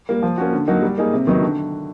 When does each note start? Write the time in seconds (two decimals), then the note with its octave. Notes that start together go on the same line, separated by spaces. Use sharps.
0.09 G3 A#3
0.23 F3
0.37 A#3 C#4 F#4
0.53 D3
0.67 F#3 A#3 D#4 F#4
0.82 G3
0.98 A#3 D#4 G#4
1.13 C3
1.27 D#3 F#3 B3 D#4
1.42 D3